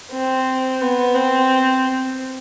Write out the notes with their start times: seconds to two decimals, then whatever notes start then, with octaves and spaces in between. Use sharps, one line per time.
0.11 C4
0.81 B3
1.15 C4